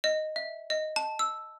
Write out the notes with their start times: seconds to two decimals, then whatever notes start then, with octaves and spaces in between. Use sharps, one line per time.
0.04 D#5
0.36 E5
0.70 D#5
0.96 A5
1.19 E6